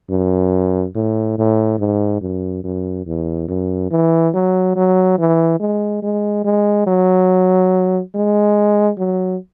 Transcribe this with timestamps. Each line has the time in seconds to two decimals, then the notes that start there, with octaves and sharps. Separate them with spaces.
0.10 F#2
0.95 A2
1.38 A2
1.79 G#2
2.22 F#2
2.64 F#2
3.06 E2
3.48 F#2
3.91 E3
4.34 F#3
4.76 F#3
5.19 E3
5.60 G#3
6.02 G#3
6.45 G#3
6.87 F#3
8.15 G#3
8.98 F#3